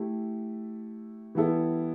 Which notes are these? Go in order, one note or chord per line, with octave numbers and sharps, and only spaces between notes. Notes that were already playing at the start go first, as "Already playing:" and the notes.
Already playing: A3 E4 G4
E3 G3 B3 E4 A4